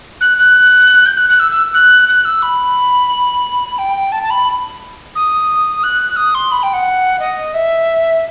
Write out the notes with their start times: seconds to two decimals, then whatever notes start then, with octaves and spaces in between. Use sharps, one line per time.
0.20 F#6
0.37 F#6
1.06 G6
1.17 F#6
1.29 F#6
1.39 E6
1.51 E6
1.74 F#6
2.08 F#6
2.24 E6
2.42 B5
3.78 G5
4.12 A5
4.23 A5
4.30 B5
5.15 D#6
5.83 F#6
6.16 D#6
6.34 C6
6.51 B5
6.63 G5
6.73 F#5
7.19 D#5
7.53 E5